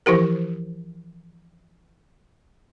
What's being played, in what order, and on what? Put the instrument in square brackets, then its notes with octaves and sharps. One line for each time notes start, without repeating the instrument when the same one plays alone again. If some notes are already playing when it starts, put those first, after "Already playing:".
[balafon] E3 F3 E4 G4 A#4